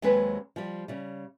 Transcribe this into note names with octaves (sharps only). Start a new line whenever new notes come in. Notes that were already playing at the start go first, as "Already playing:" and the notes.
D#2 F#3 G#3 C4 B4
F3 G3
C#3 G3